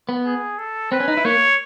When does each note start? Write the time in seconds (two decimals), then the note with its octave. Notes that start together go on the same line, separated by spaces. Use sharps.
0.09 B3
0.26 G#4
0.59 A4
0.92 C4 B4
1.00 C#4
1.08 D#4
1.17 E4
1.25 A#3 C#5